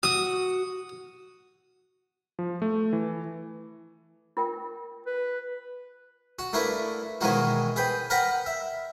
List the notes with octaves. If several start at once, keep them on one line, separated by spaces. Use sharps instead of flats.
F#4 D#6
F3
A3
E3
F4 A#4 G5
B4
F#4
A3 A#3 D4 E4 B4
B2 D#3 E3 G#3 A#3 F#4
G#4 B4 G5
A#4 B4 F#5 G5 A#5 B5
E5